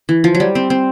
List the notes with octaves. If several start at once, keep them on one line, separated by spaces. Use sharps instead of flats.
E3
F3
F#3
G3
C4
C4